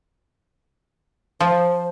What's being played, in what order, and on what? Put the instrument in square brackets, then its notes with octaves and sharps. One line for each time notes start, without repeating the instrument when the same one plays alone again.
[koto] F3 [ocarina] C5